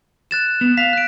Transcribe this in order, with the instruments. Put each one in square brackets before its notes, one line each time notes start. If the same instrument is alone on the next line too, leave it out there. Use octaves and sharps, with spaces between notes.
[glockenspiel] F#6 A6 E7
[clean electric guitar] B3
[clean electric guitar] F5 [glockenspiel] B6
[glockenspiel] F#6 D7